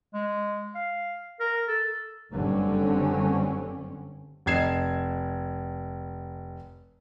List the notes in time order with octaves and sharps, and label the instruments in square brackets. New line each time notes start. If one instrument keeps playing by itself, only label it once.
[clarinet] G#3
F5
A#4
A4
[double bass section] F#1 G2 D3 G3 C4 C#4
[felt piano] F1 D#5 G#6 C7 E7